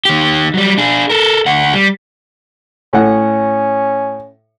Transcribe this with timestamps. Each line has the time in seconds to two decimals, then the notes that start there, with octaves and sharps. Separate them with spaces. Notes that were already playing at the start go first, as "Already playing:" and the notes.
0.05 D#3 G4
0.54 F#3 G3
0.78 D4 G#4
1.10 A4 A#4
1.46 D2 F#5
1.74 G3
2.93 A2 C#4 F#5